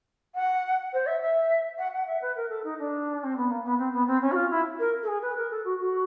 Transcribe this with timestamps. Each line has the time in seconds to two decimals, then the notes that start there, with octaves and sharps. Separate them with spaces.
0.35 F#5
0.93 C5
1.06 E5
1.21 E5
1.78 F#5
1.93 F#5
2.07 E5
2.21 B4
2.35 A#4
2.49 A4
2.64 D#4
2.78 D4
3.23 C4
3.36 B3
3.50 A#3
3.64 B3
3.78 C4
3.93 B3
4.07 C4
4.21 C#4
4.31 F#4
4.35 F4
4.50 E4
4.79 A#4
5.03 A4
5.07 G#4
5.22 B4
5.36 A#4
5.50 A4
5.64 F#4
5.79 F#4